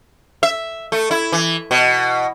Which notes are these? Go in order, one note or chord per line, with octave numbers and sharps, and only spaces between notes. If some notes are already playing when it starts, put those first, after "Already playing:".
E5
A3
E4
E3
B2